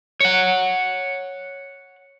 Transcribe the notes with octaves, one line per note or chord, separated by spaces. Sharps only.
C#5 F#5